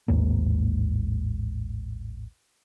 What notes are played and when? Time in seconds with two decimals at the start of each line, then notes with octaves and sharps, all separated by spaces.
0.08 A1 D#2 G#2 A#3